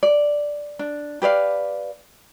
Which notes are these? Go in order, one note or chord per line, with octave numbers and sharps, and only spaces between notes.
D5
D4
G4 B4 D5 F5